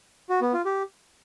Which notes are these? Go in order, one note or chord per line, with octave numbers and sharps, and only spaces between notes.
F#4
B3
F4
G4